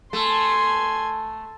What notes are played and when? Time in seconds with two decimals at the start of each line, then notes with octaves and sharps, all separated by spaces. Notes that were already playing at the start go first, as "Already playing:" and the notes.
0.13 A3 G#5 C6